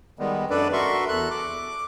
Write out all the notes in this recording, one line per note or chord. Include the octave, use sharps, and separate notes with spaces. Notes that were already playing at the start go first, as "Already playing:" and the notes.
D#3 G3 G#3 B3
F#2 D4 A4 B4 D5
F#4 A4 A#4 E5 C6 C#6
E2 A4 F#6
D6